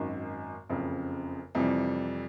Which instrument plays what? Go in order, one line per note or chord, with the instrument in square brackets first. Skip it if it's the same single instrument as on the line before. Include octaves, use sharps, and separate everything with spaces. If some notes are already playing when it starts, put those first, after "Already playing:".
Already playing: [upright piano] G#1 F#2 D#3
F#1 F2 C#3
F2 C3 E3 G3